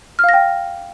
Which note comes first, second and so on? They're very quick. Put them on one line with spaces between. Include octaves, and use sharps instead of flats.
F6 F5 A#6 G5